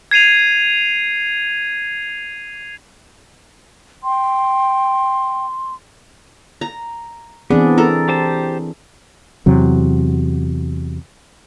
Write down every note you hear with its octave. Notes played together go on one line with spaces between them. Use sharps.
G#6 C7 D#7 F7
G5 C6
A#5
E3 B3 C4 D4 G#4
A4 A#4
G4 C5 A5
E2 C3 F#3